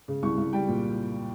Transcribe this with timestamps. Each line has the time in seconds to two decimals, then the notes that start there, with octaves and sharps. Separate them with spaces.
0.08 C#3
0.23 C2 C#6
0.37 C2
0.53 G3 G5
0.68 A#2